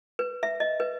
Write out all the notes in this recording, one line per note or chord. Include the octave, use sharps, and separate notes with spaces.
B4
E5
D#5
B4